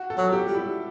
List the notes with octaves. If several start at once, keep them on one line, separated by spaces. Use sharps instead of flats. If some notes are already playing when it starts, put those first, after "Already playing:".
Already playing: F#4
A4
F#3
G4
G3
E4